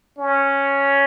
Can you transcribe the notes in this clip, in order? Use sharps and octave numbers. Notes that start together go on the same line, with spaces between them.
C#4